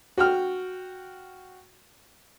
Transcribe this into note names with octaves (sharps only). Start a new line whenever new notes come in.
F#4 G5 F6